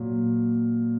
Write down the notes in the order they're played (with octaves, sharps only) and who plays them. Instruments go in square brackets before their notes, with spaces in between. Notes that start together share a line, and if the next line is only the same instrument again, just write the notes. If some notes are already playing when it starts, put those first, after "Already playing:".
Already playing: [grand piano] A#2 F#3